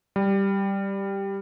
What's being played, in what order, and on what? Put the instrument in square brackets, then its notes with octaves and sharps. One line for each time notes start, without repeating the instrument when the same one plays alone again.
[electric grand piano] G3